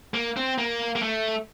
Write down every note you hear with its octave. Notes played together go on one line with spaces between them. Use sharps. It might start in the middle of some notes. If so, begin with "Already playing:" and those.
A#3
C4
A#3
A#3
A3